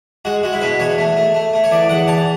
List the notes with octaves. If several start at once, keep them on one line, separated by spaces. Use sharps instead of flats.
G#3 F#4
G#3 F#4
E4
B2 B4
E2 C#5
A3
A3
A3
A3
C#5
E2 D5
E2 F#5
E3 A5